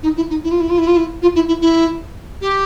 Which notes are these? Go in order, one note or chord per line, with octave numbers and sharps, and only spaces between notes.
D#4
E4
D#4
E4
F4
E4
F4
E4
F4
E4
F4
E4
E4
E4
G4